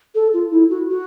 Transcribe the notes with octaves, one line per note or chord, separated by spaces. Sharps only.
A4
F4
E4
F#4
F#4